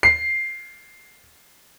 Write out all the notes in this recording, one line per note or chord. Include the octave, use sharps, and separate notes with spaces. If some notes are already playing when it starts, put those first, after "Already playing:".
C7